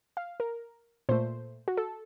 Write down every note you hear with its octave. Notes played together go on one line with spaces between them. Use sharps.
F5
A#4
A#2 A3 C5
F#4
A4